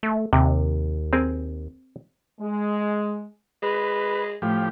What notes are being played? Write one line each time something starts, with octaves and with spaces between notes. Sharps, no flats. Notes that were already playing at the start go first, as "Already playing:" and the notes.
A3
D#2 C3
C4 G#4 A#4
G#3
G#3 B4
A2 F3 G4